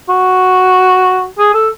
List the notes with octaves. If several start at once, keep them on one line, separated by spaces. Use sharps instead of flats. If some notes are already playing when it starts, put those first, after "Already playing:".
F#4
G#4
A4